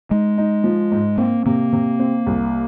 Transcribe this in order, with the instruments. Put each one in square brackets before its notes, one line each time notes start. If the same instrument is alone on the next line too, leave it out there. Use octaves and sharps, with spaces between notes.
[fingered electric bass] G#3 [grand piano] D#4
[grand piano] D#4
F3
G#2
[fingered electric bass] A#3 [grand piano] C4
[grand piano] C3 [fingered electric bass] A#3
[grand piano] C3
C4
C2